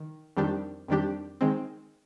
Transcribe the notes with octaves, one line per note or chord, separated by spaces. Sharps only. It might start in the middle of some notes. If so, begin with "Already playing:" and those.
Already playing: D#3
F2 D#3 G3 D4 G4
F2 D#3 G3 D4 G4
D#3 G#3 C4